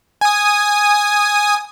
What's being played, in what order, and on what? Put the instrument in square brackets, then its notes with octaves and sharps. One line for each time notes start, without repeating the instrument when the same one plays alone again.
[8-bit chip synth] G#5 D#6